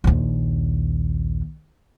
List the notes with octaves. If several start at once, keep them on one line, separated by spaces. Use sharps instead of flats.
A#1 D#2